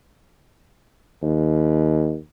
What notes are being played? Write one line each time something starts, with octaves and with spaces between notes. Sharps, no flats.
D#2